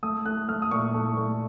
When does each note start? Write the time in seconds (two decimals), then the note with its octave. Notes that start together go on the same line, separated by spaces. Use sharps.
0.03 A3 D#6
0.25 A3 F#6
0.48 A3 F6
0.62 D#6
0.71 A#2 C#6
0.94 A3
1.17 A3